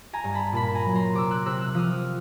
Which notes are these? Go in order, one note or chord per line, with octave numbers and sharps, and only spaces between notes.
G#5 A#5
G2
A5 B5
A#2 A5 B5
G#5 A#5
F#3
A#5 C6
C3 D6 E6
E6 F#6
C3 E6 F#6
E6 F#6
F3 D#6 F6